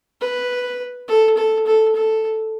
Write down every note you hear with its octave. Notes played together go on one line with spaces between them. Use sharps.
B4
A4
A4
A4
A4